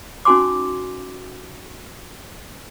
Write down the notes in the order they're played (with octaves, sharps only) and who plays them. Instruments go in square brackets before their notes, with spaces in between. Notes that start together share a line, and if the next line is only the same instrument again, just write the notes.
[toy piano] C#4 D#4 F#4 G#5 C6 D6